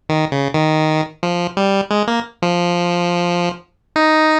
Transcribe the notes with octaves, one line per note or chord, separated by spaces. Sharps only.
D#3
C#3
D#3
F3
G3
G#3
A#3
F3
D#4